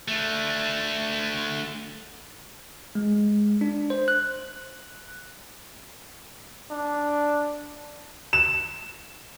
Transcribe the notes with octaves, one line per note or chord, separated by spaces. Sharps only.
A3 D4
G#3
D4
C5
F#6
D4
E7